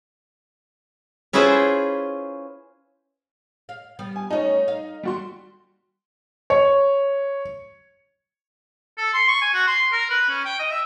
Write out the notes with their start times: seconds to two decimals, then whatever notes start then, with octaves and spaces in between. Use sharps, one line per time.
1.33 C#4 E4 F4 G#4 B4 C5
3.69 F5
3.99 G3 B3
4.16 G#5
4.30 A3 C#4 D#4
4.68 F5
5.03 G3 F#4 C6
6.50 C#5
8.98 A4
9.13 C6
9.28 C#6
9.42 G#5
9.54 F#4
9.67 C6
9.92 A#4
10.10 B4
10.29 C#4
10.45 G5
10.59 D#5
10.71 E5